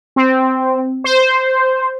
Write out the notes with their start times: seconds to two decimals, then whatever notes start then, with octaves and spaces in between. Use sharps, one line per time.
0.16 C4
1.04 C5